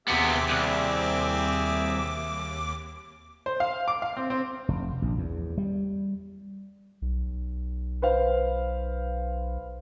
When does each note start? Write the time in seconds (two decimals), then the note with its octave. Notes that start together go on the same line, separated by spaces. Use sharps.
0.08 D#2 C3 B3 C4 G#4 E5 D6
0.50 C2
3.46 C5
3.60 F5
3.88 D6
4.02 F5
4.17 C4
4.30 C4
4.68 F1
5.02 A#1
5.18 E2
5.58 G3
7.02 B1
8.02 B4 C5 F5